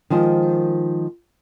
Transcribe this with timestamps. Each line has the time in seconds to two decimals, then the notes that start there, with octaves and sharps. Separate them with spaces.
0.10 D#3 F3 G#3 C5 D#5